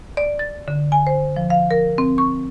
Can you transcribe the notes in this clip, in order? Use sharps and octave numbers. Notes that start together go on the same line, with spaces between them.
D5
A6
D3
G#5
C5
F3
F5
A#4
C4
C#6